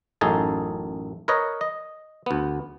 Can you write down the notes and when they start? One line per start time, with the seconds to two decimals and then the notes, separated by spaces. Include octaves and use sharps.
0.21 A1 F#2 D#4 G#4 A4
1.28 A#4 B4 C#5 D#5
1.61 D#5
2.26 D2 B3